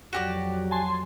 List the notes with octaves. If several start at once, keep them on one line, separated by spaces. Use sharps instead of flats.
F2 F#3 F#4 G4 D5
G#5 A5 C6